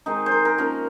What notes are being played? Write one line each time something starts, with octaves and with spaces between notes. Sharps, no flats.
D#3 G#3 C4 D#4
C5
A#4
A#4
F3 A#3 C#4 A#4